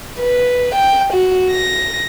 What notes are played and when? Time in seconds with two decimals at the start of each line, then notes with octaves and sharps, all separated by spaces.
0.19 B4
0.75 G5
1.13 F#4
1.50 A#6